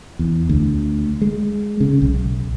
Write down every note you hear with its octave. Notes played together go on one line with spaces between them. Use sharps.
E2
D2
G#3
C#3
B1